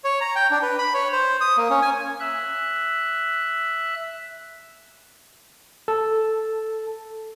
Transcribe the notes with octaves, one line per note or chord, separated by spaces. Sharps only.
C#5
A#5
G5
D4
B4
B5
C#5
C5
D#6
A#3
C#4
G#5
E5 F#6
A4